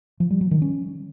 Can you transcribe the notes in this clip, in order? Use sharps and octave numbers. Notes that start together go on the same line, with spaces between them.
F3
G3
F#3
D#3
C#4